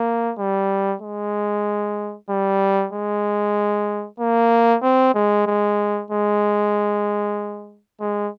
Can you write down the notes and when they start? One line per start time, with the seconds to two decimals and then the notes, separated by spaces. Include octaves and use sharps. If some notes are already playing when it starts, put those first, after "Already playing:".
Already playing: A#3
0.38 G3
1.02 G#3
2.30 G3
2.93 G#3
4.19 A#3
4.82 C4
5.15 G#3
5.46 G#3
6.10 G#3
8.01 G#3